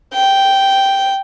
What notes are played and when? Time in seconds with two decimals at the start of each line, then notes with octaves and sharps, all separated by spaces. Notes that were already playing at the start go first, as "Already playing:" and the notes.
0.14 G5